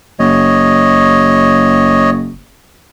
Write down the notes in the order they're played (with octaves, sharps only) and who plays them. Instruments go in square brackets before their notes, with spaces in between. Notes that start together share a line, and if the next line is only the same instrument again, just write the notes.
[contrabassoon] F#1 [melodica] C#5 D#5